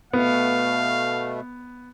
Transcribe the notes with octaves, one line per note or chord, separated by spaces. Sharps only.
B2 A3 B3 F5